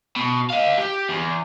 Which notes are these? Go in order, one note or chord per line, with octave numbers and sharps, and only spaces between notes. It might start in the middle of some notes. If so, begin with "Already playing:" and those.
B2
D#5 F5
G4
E2